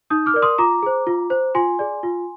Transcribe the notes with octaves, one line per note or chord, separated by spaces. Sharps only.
D#4 D#6 G6
D6 F6
A#4 D5
C6 D#6
F4 A#5 D6
G#4 C5
F4
C5
F4 G#5 C6
G#4 D5
F4